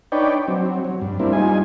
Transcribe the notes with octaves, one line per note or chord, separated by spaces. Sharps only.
D4 D#4 B4 C#5 D5 G5
F#3 C4
F#3
G2
G3 A#3 C4 D4 E4
G3 D#4 F4 G#5